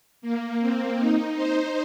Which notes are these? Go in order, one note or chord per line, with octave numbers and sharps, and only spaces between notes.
A#3
C4
D#4
C5